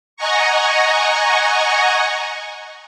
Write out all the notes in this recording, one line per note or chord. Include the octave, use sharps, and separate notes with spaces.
D#5 F#5 G#5 A#5 C#6